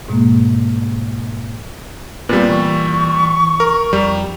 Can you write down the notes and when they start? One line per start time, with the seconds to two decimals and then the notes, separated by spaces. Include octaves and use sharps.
0.08 G#2 B2 G#3 A#3
2.29 A#2 G3 B3 C4 B4
2.50 E3 C#6
3.60 A#4
3.93 F2 G3 A#5